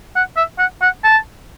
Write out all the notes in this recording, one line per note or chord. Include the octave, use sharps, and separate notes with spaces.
F#5
E5
F#5
F#5
A5